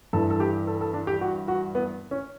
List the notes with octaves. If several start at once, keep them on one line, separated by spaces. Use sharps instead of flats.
G2 E3 A4
A4
G4
A4
A4
D4
G4
F#4
F#4
B3
C#4